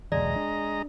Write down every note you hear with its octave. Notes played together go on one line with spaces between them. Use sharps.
B1 E2 D3 G#3 D5 D#5 A#5
D4